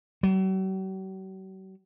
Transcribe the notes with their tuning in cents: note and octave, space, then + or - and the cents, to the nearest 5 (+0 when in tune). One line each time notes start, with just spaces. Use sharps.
F#3 +45